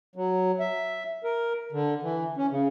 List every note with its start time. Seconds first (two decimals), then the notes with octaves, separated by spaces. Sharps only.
0.16 F#3
0.59 E5
1.24 A#4
1.72 D3
2.03 E3
2.37 C#4
2.51 C#3